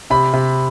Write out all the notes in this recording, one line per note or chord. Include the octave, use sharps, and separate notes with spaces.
C3 B5
C3